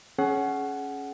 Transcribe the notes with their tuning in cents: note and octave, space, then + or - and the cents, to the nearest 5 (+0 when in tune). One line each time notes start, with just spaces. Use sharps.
C#4 +0 G#4 +30 F#5 +10